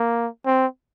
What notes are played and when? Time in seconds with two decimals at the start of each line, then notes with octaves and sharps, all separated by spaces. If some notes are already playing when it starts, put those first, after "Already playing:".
Already playing: A#3
0.46 C4